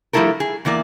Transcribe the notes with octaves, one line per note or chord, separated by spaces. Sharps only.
F3 G3 A3 E4 A4 A#4
G#4
E2 E3 A#3 D5